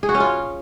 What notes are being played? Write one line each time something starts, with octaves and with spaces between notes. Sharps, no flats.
G#4
F#4
C#4
F4